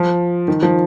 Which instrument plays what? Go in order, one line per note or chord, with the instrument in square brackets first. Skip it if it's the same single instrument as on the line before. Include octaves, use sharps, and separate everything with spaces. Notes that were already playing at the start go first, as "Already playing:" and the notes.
Already playing: [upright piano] F3
D#3
F3